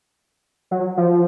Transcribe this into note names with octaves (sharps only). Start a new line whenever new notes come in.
F#3
F3